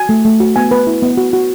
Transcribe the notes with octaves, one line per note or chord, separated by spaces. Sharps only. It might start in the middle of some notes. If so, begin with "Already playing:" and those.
Already playing: F#4 G#5
A3
A3
F#4
B3 G#5
B3 B4
E4
B3
F#4
F#4